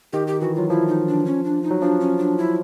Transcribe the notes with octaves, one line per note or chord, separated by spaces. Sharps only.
D#3 G4
G4
E3 F#4
F#3 F4
F3 E4
D#4
D4
C#4
D4
D#4
F#3
F3 D4
C#4
D4
E4